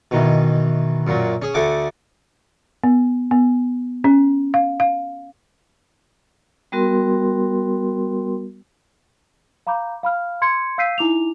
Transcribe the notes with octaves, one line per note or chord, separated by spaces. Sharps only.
B2 D#3 E3
F#2 A#2 F#3
C#4 G#4
D2 A3 F#5 G#5 D6
B3
B3
C#4
F5
F5
G3 B3 F#4 A#4 C6
F5 A#5 B5 D6 G6
F5 B5 F6
C6 G#6 C#7
F5 E6 G6 B6 C7 D#7
D#4 E4 D6 F7